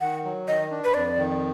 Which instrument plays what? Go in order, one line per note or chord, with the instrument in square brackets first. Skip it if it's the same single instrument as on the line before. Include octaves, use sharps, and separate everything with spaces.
[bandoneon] D#3 [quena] F#5
[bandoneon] F#3
[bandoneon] D#3 [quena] D#5
[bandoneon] D4
[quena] B4
[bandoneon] F2 [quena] D5
[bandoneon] D#3